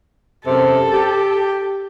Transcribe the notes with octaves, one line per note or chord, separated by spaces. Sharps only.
F#2 C3 A4
G4